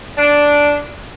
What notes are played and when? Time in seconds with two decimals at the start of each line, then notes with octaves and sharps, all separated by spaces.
0.17 D4